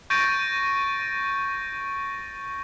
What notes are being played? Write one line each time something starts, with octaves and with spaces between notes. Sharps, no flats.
C#6 G6 A6 A#6 D7 D#7